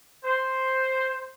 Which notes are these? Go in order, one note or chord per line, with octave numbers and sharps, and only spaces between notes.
C5